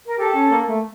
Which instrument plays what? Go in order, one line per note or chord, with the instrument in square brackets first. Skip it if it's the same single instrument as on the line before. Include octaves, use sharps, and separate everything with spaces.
[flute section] A#4
[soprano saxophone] G4 [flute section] A4
[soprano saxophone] C#4
A#3
A3